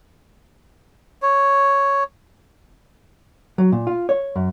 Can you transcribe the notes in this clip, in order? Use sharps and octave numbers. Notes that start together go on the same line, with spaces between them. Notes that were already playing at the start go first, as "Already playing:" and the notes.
C#5
F#3
A#2
F4
C#5
F#2